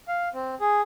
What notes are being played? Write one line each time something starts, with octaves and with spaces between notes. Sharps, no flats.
F5
C4
G#4